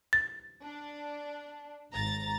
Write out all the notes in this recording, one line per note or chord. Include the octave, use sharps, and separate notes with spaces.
A6
D4
G#1 A#5 A6